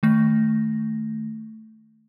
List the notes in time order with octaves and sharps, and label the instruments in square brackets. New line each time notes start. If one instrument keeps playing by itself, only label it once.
[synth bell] D#3 A3 A#6